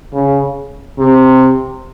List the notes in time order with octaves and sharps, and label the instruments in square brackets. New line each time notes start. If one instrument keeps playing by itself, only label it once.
[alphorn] C#3
C3